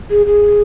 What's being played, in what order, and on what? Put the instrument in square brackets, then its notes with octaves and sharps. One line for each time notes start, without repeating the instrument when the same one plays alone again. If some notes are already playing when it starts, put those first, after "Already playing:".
[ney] G#4
G#4